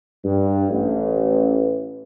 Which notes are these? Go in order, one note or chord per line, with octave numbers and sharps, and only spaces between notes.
G2
A1